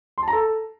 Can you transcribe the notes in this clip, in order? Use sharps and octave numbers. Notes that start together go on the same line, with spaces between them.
C6
A5
A#5
A4